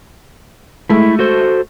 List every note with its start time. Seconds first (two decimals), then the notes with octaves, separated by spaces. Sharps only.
0.90 G#3 A3 E4
1.19 F#4 A4 C5